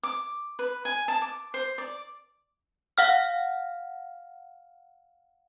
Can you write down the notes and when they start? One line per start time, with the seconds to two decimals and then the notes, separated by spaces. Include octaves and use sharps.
0.03 D6
0.59 B4
0.85 G#5
1.08 A5
1.22 D6
1.54 C5
1.78 D5
2.98 F5 F#5 F6